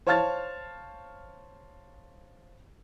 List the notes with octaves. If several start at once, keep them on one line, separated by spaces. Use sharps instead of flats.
C5 C#5 F5 A5 F6 A6